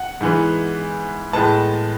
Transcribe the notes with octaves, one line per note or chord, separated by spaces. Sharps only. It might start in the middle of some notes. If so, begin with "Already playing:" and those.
Already playing: F#5
G#2 E3 B3
A2 G#3 B3 A5